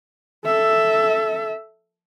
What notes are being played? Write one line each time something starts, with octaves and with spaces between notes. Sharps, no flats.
A4 E5